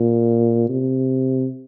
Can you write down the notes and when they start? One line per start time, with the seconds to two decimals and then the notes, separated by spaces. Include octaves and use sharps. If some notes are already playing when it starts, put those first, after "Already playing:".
Already playing: A#2
0.69 C3